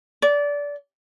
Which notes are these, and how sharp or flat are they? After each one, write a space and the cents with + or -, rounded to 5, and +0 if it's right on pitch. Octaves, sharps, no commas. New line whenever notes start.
D5 -20